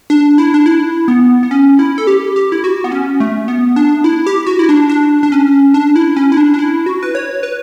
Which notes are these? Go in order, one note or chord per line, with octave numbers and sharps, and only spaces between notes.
D4
E4
D4
E4
B3
B3
C#4
E4
A4
G4
G4
E4
F#4
B3
C#4
A3
B3
D4
E4
G4
F#4
E4
D4
D4
D4
C#4
D4
E4
C#4
E4
D4
D4
E4
F#4
B4
C#5
B4